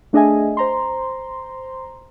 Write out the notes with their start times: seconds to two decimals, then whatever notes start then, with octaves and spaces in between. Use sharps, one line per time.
0.13 A3 D4 G#4 D#5 E5 G#5
0.57 C5 A#5 C6